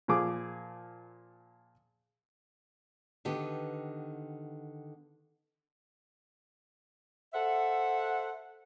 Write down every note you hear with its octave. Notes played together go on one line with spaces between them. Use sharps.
A#2 F3 G#4 D6
D3 D#3 B3 G4
A4 C5 E5 F#5